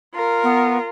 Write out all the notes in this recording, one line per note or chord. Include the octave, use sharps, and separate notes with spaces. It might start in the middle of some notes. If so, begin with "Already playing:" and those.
F4 A#4
B3